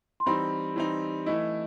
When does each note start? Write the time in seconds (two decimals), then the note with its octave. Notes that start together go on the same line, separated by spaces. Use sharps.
0.20 C6
0.26 E3 G3 C4 D#4 B5
0.76 E3 G3 C4 D#4
1.26 E3 A3 E4 D#5